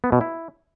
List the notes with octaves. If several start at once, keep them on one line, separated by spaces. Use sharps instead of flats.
B3
B2
E4